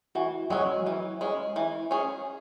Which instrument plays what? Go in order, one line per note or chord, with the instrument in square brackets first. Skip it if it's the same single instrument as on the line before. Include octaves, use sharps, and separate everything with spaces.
[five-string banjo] E3 [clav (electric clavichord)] F#4
[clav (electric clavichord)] F#3 [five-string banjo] G#3 C#4
[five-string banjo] E3
G#3 C#4
E3
C#4 G#4